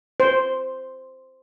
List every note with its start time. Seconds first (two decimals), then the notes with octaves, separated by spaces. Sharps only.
0.20 C5